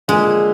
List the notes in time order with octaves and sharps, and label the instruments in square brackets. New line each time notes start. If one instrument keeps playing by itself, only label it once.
[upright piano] D3 F3 A#3 [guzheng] G#3